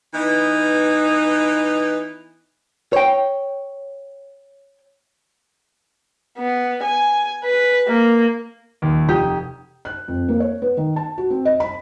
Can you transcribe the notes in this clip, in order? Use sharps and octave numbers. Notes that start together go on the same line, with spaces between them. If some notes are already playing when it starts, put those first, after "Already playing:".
E3 B3 D#4
C#5 G5
B3
G#5
B4
A#3
D#1 D#2
F1 G4 D#6
F#6
F2
A#3
C#5
B3
D#3
A5
F#4
C4
D#5
B5